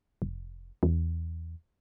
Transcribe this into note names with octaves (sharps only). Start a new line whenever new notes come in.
F1
E2